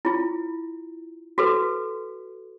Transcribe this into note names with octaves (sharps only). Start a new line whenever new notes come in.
E4 F4
F#4 A4 B4